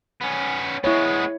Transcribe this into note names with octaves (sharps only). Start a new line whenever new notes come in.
B3 C#4
G#3 B3 E4 C#5